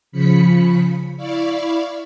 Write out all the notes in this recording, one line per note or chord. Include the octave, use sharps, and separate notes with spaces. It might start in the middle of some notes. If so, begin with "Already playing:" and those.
C#3 F3 B5 B6 C#7
E4 D5 F5 B5 C#6